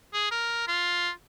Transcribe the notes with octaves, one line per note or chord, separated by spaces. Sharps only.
G#4
A#4
F4